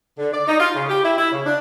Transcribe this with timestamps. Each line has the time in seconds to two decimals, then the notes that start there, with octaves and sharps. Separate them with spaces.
0.19 D3
0.33 D5
0.47 D#4
0.60 F4
0.75 C#3
0.89 G4
1.03 E4
1.18 E4
1.32 C#3
1.46 D4